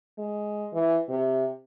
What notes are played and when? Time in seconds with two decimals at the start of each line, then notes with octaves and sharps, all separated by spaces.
0.18 G#3
0.73 E3
1.09 C3